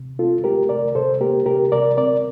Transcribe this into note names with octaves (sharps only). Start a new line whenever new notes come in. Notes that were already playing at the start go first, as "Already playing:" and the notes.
Already playing: C3
C4 F4 A4
A3 G4 A#4
C3 A#4 D5
C3 A4 C5
A#3 G4 A#4
C3 G4 A#4
C3 A#4 D5
C4 A#4 D5